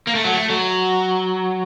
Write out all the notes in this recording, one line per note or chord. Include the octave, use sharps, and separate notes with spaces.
A#3
A3
F#3
A3
F#3